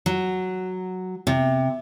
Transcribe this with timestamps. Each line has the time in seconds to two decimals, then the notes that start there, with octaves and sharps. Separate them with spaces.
0.06 F#3
1.27 C3